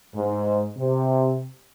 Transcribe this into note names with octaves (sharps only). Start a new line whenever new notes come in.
G#2
C3